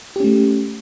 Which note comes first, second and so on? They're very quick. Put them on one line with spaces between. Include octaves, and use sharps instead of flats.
G4 C#4 A3